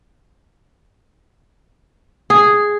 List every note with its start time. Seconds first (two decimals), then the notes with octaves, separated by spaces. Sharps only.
2.30 G#4